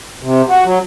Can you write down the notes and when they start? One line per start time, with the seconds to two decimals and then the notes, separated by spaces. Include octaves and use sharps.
0.22 C3
0.49 F#4
0.65 F#3